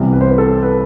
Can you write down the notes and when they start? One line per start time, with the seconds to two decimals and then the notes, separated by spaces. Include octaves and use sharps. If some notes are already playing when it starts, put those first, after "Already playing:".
Already playing: C2 C3 E3 G3 B3
0.13 B4
0.21 C5
0.28 B4
0.38 A4
0.63 B4